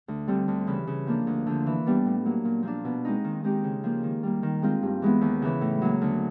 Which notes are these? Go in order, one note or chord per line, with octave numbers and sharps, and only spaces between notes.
D2
D3 G3 C4
D2
C#3 E3
C#3
F3 A#3 D4
D2
D3 F3
E3
G3 B3 D4
A2
F#3 A#3
A#2
F3 A#3 D4
B2
G#3 C4 D#4
D#3
G#3 C4 D#4 G4
C#3
F3 A#3
D#3
G3 A#3
D#3
G#3 C4 F4
G2
E3 G#3 B3
D#2
C#3 E3
A2
F#3 A#3
D2